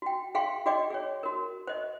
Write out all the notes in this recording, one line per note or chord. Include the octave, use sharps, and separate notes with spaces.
F#4 G5
G#4 F5 G5 C6
F#4 G#4 D5 D#5 G5 D6
G#4 C#5
F#4 A#4
C5 D#5